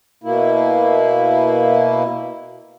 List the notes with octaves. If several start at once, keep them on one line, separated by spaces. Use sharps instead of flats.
B2 A#3 E4